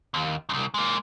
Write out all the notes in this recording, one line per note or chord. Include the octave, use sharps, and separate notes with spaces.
D#2
C2 F#2
G#3 A#3